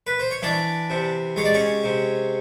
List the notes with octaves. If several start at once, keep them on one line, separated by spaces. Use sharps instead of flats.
B4
C5
C#5
E3 D4 D5
C3
G#3 C#5
D5
C#4 C#5
C3